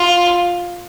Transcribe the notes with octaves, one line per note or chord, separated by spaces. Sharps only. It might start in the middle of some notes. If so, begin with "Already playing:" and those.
Already playing: F4